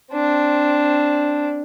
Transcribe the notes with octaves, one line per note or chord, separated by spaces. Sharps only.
C4 D4